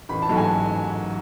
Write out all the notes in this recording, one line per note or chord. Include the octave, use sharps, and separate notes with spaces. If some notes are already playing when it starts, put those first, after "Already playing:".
A1 B5
A5
G#2 F#3 A3
G#5